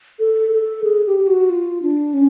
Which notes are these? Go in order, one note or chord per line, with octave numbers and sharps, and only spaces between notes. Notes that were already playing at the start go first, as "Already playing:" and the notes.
A4
A4
G#4
G4
G4
F#4
F4
D4
C#4